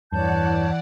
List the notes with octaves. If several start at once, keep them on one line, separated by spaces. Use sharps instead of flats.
E2 G2 E3 C#5 D5 F#5 A5 G6